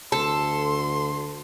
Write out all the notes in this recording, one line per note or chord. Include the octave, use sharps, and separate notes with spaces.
D2 A4 C6